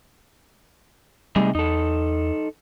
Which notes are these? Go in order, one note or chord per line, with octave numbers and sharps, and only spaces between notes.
C3 G3 A3 D#4 G#4
E2 D#4 A4